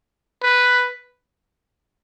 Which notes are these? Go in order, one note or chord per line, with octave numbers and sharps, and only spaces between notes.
B4